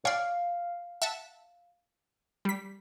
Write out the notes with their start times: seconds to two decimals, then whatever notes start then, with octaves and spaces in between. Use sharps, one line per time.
0.05 C#5 D5 F5
1.02 E5 F#5 A5
2.45 G3 B6